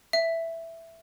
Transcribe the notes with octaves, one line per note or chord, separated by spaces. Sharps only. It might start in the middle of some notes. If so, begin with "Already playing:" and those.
E5